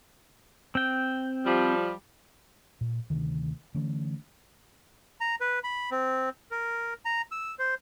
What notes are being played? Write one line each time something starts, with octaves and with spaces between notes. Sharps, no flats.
C4 G5
F3 G3
A#2
D2 C3 D#3 E3
D3 E3 A3 C#4
A#5
B4
B5
C4
A#4
A#5
E6
C5